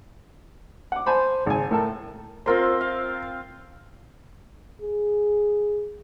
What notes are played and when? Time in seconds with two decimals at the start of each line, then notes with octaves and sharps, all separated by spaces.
0.92 F#5 D6
1.06 C5 G#5 A5 B5
1.46 G#1 C#3 G#5
1.71 A2 A4 A#4 A5
2.46 C4 F4 A#4 C5 C6
2.81 F5
4.82 G#4